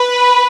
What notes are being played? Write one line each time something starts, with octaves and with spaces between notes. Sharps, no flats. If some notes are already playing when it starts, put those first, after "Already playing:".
Already playing: B4